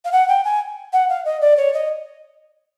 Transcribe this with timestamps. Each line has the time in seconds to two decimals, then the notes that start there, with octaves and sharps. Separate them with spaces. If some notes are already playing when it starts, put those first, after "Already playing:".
0.04 F5
0.12 F#5
0.28 G5
0.45 G#5
0.93 F#5
1.09 F5
1.25 D#5
1.41 D5
1.57 C#5
1.74 D#5